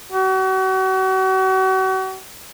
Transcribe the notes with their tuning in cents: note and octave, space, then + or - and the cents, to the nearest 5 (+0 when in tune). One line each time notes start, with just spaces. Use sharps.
F#4 +40